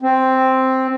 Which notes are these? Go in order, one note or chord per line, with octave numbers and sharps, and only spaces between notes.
C4